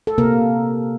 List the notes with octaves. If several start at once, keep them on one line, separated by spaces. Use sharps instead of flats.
A4
C3 A#3 A#4